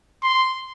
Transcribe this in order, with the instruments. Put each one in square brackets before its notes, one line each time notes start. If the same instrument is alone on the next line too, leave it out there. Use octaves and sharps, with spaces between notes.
[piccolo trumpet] C6